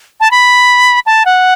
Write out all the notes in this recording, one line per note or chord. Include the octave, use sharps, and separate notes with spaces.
A5
B5
A5
F#5